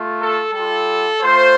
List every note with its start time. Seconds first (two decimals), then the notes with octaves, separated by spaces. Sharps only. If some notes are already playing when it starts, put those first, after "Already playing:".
Already playing: A3 F4
0.19 A4
0.53 G3 F4 A4
1.22 A3 F4 C5